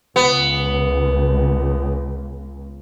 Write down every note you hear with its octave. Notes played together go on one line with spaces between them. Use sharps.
C#2 B3